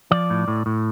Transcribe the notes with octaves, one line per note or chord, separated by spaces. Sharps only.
F3 D5
A2
A2
A2